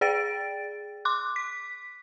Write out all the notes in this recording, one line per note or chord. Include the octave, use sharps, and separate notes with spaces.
G#4 D5 G5 A6 D7
C6 D6 F#6
B6